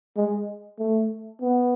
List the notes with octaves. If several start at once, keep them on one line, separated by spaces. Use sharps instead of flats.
G#3
A3
B3